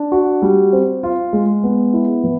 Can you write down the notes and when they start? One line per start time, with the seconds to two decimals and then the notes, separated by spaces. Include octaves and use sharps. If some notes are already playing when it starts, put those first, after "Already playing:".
Already playing: D4
0.12 F#4
0.42 G3
0.73 C4
1.03 F4
1.33 G#3
1.63 B3
1.94 E4
2.24 E3